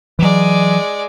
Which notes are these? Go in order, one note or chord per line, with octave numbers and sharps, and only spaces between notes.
E3 F#3 G#3 D5